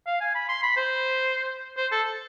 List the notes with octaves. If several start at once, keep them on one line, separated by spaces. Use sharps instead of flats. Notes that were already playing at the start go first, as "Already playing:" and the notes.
F5
G#5
B5
C6
B5
C5
C5
A4